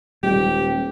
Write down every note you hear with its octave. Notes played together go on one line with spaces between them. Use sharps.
D#1 G3 G#3 A#3 G4